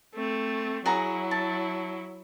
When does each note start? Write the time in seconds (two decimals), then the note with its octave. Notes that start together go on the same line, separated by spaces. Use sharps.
0.15 A3 C4
0.86 F#3 E4 F#4 G#4 A#5
1.31 A5